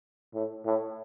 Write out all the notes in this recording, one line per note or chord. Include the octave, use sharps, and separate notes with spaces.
A2
A2